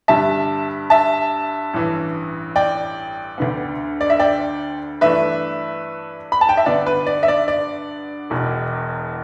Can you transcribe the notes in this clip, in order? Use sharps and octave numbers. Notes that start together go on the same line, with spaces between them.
G2 D3 G3 E5 A5
E5 A5
A1 G2 E3
D5 G5
D2 D3 B3
D5
E5
D5 G5
G2 E3 A3 D4 B4 E5
B5
A5
G5
E5
G2 D3 B3 D4 D5
B4
D5
E5
D5
D5
E1 E2 B2